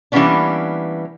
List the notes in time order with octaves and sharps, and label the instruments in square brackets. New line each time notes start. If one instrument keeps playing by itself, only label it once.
[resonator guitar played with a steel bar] E3 G3 A#3 B3 C#4 D4